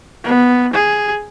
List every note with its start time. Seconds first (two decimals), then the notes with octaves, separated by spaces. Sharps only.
0.24 B3
0.74 G#4